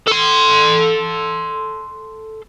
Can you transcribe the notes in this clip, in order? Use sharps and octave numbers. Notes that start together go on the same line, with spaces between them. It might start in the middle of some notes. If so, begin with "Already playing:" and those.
A4 C6